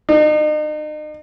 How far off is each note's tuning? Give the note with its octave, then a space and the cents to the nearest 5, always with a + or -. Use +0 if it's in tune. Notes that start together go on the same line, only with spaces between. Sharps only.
D#4 -40